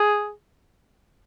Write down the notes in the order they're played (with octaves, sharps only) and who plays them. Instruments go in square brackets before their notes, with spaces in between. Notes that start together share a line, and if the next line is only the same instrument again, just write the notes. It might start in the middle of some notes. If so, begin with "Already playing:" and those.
Already playing: [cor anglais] G#4